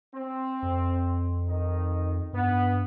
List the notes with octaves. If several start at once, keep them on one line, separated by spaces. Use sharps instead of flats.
C4
F2
D#3 F3 D#4
G2 B3